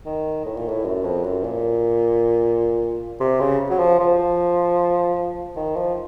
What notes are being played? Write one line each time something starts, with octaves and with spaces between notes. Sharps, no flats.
D#3
A2
A#2
A2
F#2
F2
F#2
A#2
C3
C#3
F#3
F3
F3
D#3
F3